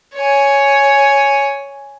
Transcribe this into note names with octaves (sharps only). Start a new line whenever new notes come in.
C#5 G#5